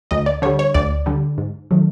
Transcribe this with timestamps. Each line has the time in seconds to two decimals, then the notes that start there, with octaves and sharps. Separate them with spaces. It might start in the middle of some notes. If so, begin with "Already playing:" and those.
0.11 D2 D#5
0.26 D5
0.42 D3 G3 C#5
0.59 C#5
0.74 D2 D5
1.06 D3 G3
1.38 G#2
1.71 D#3 F#3 A3